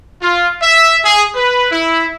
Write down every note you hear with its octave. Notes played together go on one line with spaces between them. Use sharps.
F4
E5
G#4
B4
E4